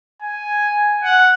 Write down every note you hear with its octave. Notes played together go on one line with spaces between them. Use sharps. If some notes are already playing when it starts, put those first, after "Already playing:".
G#5
F#5